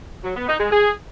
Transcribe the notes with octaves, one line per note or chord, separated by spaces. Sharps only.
F#3
B3
D#4
G#3
G#4